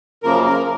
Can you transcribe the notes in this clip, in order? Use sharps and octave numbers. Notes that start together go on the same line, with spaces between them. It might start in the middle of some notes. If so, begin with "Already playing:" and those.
F#2 C#3 F3 A#3 A#4
A#4